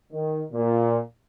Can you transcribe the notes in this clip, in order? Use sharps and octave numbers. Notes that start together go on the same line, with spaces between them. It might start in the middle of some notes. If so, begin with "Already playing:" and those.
D#3
A#2